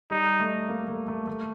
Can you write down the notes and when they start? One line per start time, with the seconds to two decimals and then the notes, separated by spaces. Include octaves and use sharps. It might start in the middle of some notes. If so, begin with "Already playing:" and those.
0.11 G3 D#4
0.40 A3
0.69 A#3
0.88 A3
1.08 A3
1.27 A3